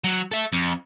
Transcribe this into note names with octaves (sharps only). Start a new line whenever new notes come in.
F#3
A4 E5
F2